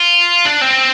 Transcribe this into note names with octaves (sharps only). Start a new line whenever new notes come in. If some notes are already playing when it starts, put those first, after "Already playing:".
Already playing: F4
D4
C4